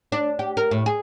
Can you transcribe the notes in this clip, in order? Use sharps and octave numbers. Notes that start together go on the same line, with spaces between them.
D4
G4
A#4
A2
G#4